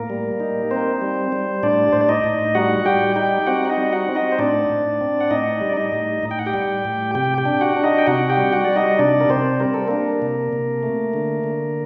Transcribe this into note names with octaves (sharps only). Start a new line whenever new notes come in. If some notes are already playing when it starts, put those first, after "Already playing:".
Already playing: A2 A#3 A#4
G3
D#4
C4 C5
G3
G3
A2 D4 D5
A2 C5
D5
D#4 D#5
A2
G3 F#4 F#5
G3 G4 G5
D#4 G4 G5
C4 F#4 F#5
F#5
D#4 D#5
G3
F#4 F#5
C4
D#4 D#5
C5
A2 D4 D5
A2
C4
F#5
A2 D#4 D#5
G3
D5
D#4 D#5
A2
A2
G5
F#5
G4 G5
G3
A2
C3 G4 G5
G4 G5
D4
F#4 F#5
D4
D#4 D#5
G5
C3 F#4 F#5
G4 G5
G3
F#4 F#5
G3 D5
D#4 D#5
C3 D4 D5
A#4
C3 C4 C5
G3 A#4
A4
A#3 D4 A#4
C3
C3
A3
D3
D3